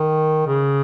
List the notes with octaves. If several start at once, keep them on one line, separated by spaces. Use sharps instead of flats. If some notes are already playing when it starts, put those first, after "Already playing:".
Already playing: D#3
C#3